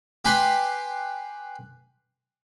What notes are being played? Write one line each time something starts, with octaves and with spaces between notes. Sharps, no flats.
G4 B4 G#5 B5 C6